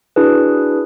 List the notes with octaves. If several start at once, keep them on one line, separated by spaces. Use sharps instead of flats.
D4 E4 F#4 G#4 B4